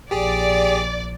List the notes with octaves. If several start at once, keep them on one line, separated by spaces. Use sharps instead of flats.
A#1 G4 G#4 D5